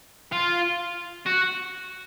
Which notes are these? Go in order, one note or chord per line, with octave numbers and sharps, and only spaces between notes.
F4
F#4